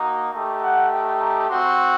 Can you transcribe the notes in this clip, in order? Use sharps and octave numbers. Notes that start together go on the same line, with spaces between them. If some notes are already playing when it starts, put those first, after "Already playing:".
Already playing: A#3 D#4 F#4
A3 D#4 G4
F#5
G5
A#5
C4 F#4 C6